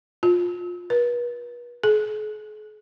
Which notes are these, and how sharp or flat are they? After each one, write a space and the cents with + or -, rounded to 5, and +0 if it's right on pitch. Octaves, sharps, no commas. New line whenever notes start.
F4 +20
B4 -40
G#4 +45